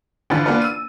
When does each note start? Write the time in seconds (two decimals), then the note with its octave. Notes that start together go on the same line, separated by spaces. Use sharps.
0.30 G1 D3 E3 F4 B4 A6
0.46 A#3 B3 D4 F4 B4
0.62 E6 D#7